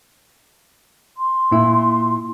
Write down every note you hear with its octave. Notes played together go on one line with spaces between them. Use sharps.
C6
A#2 E4